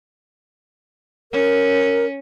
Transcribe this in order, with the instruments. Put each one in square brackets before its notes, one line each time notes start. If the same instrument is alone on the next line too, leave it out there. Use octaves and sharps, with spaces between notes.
[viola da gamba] C#4 [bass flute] A#4